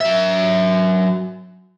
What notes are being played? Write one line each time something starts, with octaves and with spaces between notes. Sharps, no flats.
F#3 E5